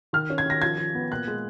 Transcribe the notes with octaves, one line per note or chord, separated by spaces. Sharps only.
D#3 F6
C#4
G#6
D#3 A#6
F3 G#6
F3
B3
A#2 F#6
G#3